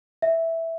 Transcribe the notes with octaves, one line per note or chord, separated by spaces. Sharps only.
E5